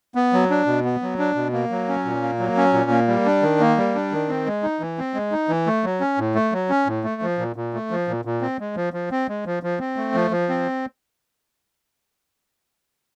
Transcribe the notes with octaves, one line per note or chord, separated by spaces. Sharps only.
B3
F#3
D4
B2
B3
F#3
D4
B2
A#3
F#3
C#4
A#2
A#3
F#3
C#4
A#2
A#3
G3
D4
D#3
A#3
G3
D4
D#3
C4
G#3
D#4
E3
C4
G#3
D#4
E3
A3
F#3
C#4
A2
A3
F#3
C#4
A2
A3
F3
A#2
A#2
A3
F3
A#2
A#2
C4
G#3
F3
F3
C4
G#3
F3
F3
C4
A3
F3
F3
C4